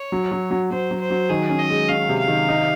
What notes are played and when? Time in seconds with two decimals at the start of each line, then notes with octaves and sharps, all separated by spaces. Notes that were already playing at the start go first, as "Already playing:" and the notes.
Already playing: C#5
0.12 F#3
0.32 F#3
0.51 F#3
0.71 F#3 C5
0.91 F#3
1.01 C5
1.11 F#3
1.30 D#3 G#4
1.49 C#4
1.59 D#5
1.70 G#3
1.89 C#4 F5
2.09 C3
2.19 F5
2.28 D#3
2.49 D#4